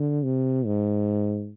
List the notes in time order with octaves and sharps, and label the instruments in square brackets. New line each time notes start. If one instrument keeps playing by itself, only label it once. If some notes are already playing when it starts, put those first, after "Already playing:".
Already playing: [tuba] D3
C3
G#2